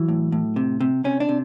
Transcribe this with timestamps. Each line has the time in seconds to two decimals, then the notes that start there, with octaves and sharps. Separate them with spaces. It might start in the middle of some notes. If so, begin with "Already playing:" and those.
Already playing: E3 F#3
0.08 A2
0.32 A2
0.56 C3
0.81 C3
1.04 C3 C#4
1.20 D4
1.29 C3